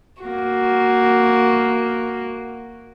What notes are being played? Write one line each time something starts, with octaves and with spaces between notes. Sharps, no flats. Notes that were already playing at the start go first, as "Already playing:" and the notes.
A#3 F#4